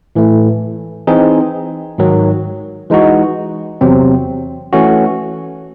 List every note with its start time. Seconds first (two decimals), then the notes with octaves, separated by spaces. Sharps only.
0.15 A2 E3 A3
1.07 E3 C4 D#4 G#4
1.98 G#2 D#3 F#3
2.90 E3 G#3 D#4 F#4
3.81 E2 C3 F#3 C4
4.73 E3 A3 C#4 F#4